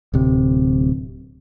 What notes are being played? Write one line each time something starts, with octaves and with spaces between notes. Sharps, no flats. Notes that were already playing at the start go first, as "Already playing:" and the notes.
D1 C3